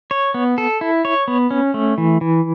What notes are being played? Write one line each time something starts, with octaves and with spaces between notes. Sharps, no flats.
C#5
B3
A4
E4
C#5
B3
C#4
A3
E3
E3